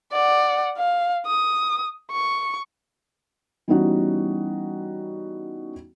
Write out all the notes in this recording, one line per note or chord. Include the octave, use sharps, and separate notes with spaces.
D5 F#5
F5
D#6
C#6
E3 G3 B3 C#4 D#4 F#4